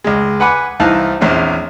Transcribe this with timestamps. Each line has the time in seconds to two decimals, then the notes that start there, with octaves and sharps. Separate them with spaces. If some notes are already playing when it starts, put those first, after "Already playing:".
0.04 C#2 G#3
0.40 B4 F#5 G#5 B5 D6
0.80 C2 E3 D#4 F5 A5 F#6
1.21 A#1 E2 C4 C#4